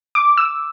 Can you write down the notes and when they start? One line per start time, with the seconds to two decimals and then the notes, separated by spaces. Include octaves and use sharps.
0.15 D6
0.37 E6